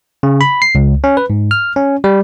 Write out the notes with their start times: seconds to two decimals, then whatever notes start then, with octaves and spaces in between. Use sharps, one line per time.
0.23 C#3
0.41 B5
0.62 C7
0.75 C#2
1.04 C#4
1.17 B4
1.30 G#2
1.51 F6
1.76 C#4
2.04 G3